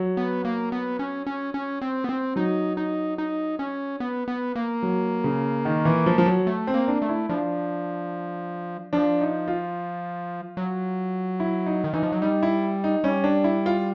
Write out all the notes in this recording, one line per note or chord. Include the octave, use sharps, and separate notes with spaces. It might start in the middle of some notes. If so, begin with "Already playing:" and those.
Already playing: F#3
B3
A#3
B3
C#4
C#4
C#4
C4
B3
C4
F#3 D#4
D#4
D#4
C#4
B3
B3
A#3
F#3
C#3
D#3
E3
F3
F3
F#3
A3
C4
A#3
D4
A3
E4
F3 D4
F3 D4
D#4
F4
F#3
E4
D#4
D#3
E3 D#4
F3
F#3
G3 D#4
E4
D#4
G3 C#4
D4
E4
F4